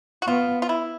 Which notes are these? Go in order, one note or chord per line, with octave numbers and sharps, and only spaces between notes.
F#4
B3 F4
F4
E4